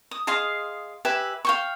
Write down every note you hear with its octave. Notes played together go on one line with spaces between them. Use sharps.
D#6
G#4 D#5 F5 C6
G4 B4 E5 G#5
F5 G5 C#6